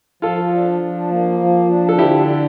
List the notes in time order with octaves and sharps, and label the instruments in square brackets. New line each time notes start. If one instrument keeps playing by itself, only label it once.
[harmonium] F3 [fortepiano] F4 A4
[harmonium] D4
F3
A#3
F3
D4
[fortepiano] A4
[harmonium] D3 [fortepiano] E4 G4
[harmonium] D4